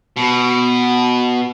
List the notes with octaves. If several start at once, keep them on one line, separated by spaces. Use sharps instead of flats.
B2